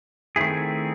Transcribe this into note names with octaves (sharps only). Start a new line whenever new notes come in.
D#3 A3 C4 E4 G#4